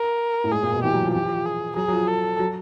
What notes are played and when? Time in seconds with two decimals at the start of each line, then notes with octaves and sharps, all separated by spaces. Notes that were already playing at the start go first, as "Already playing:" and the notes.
Already playing: A#4
0.44 A2
0.52 G#2 G#4
0.63 A#2
0.74 B2
0.84 E3 G4
0.93 F#3
1.04 F3
1.14 E3 G4
1.25 F3
1.35 F3
1.46 G#4
1.76 F#3 G#4
1.88 F#3
1.92 F3
2.08 A4
2.39 F#3